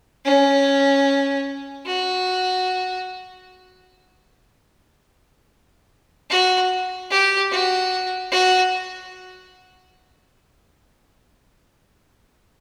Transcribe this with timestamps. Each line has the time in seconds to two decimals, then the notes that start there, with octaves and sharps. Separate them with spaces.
0.25 C#4
1.86 F#4
6.30 F#4
7.11 G4
7.51 F#4
8.32 F#4